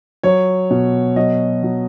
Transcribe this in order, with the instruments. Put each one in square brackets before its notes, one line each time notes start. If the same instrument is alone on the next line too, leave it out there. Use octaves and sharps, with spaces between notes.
[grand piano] F#3 C#5
B2
F#3 D#5
F#3